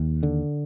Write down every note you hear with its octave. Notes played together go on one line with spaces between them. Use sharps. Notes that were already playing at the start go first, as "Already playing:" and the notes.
Already playing: D#2
D3